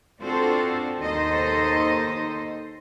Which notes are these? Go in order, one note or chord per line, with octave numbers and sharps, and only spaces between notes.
C4 D4 F4 F#4 A4 C5
D#2 D#3 D#4 A4 C5 D#5